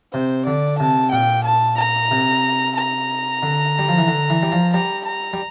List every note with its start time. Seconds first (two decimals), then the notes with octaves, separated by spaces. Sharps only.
0.14 C3 C5
0.47 D3 D5
0.80 C3 A5
1.12 A#2 G5
1.45 A5
1.79 A#5
2.11 C3
2.77 A#5
3.43 D3
3.79 G3
3.89 F3
3.98 E3
4.08 D3
4.30 E3
4.43 G3
4.52 F3
4.74 G3 A#5
5.06 A#5
5.33 G3